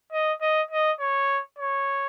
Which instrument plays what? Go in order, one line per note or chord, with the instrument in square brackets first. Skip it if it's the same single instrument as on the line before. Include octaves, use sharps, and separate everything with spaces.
[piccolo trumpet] D#5
D#5
D#5
C#5
C#5